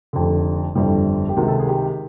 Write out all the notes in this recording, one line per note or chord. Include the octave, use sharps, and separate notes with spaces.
F1 F2 D3
G1 F2 D3 G3 E4
G4
C#2 C3 D#3 F#4
A4
G#4
G4